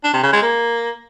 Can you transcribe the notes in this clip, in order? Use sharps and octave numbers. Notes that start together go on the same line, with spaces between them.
D4
C3
C#3
G#3
A#3